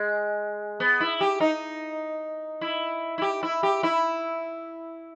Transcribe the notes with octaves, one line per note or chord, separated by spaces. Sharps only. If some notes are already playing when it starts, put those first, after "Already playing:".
Already playing: G#3
B3
E4
G4
D#4
E4
E4
G4
E4
G4
E4